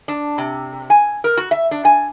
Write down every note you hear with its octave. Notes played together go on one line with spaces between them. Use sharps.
D4
C3
G#5
A#4
F#4
E5
D4
G#5